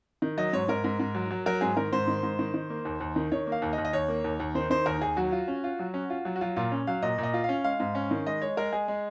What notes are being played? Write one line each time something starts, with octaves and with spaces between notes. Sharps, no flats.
D#3
F#3 D#5
G#2 C#5
G#2 A#4
G#2
G#2
F#3
F#3
F#3 A#4
G#2 G#4
D#3 A#4
G#2 C5
D#3
G#2
D#3
D#3
A#3
D#2
D#2
D#3
D#3 C#5
A#3
F5
D#2
D#5
D#2
D#5
D#2 C#5
A#3
D#2
D#2
D#3 C5
D#3 C5
D#2 A#4
D#2 G#4
F#3 F#4
F4
C#4
F4
F#3
C#4
F4
F#3
F#4
F#3 F4
A#2 F4
C#4
F#3 F5
A#2 D#5
A#2
D#5
F4
C#4 F5
G#3 F5
G#2
C#4
D#3
G#3 D#5
G#3 C#5
G#3 A#4
G#3 G#4
G#3